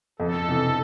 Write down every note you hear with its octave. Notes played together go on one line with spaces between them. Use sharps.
F2 A4
C3 E3